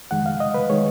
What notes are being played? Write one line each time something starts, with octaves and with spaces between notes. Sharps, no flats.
F2 D#3 G#3 F#5
F5
D#5
B4
D#3 G#3 C#5